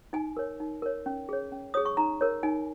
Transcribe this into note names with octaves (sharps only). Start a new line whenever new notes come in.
D#4 G#5
A#4 C#5
D#4
A#4 C#5
C#4
G#4 C#5
C#4
G#4 C#5 D#6
C#6
D#4 A#5
A#4 C#5
D#4 G#5